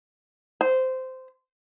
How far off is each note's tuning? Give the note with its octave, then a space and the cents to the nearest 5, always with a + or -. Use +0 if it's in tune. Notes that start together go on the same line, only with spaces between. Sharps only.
C5 -15